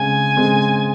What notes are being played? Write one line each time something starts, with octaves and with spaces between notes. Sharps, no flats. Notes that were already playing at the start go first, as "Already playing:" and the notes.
Already playing: C#3 G#3 C4 G#5
C#3 G#3 C4